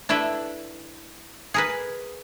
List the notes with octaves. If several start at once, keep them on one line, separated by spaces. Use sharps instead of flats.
D4 E4 A4 B4 E5
G#4 A#4 B4